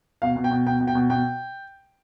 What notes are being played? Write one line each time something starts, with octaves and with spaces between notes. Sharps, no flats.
B2 F5
B2
G5
B2
B2 G5
B2
G5
B2
B2 G5